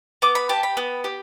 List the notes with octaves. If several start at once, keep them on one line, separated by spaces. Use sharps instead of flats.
B3 D6
B5
G4 A5
B5
B3
G4